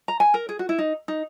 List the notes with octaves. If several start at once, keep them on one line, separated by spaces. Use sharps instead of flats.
A#5
G#5
A#4
G#4
F#4
E4
D#4
D#4